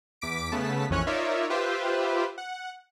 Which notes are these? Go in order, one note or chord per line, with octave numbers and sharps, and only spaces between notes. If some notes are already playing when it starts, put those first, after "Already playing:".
E2 D6 B6 D7
C#3 A3 B3 A5 B6
A#1 F2 E3 C#4 C#5 F#6
D#4 F4 A#4 C#5 D5 E5
F4 G4 B4 C5 E5
F#5